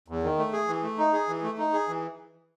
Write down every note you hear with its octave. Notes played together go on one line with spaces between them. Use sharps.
E2
D#3
A3
G#4
E3
A3
D#4
G#4
E3
A3
D#4
G#4
E3